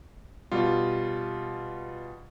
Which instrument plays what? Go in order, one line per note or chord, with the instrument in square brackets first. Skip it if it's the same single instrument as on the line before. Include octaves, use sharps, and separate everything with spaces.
[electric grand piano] B2 G3 F4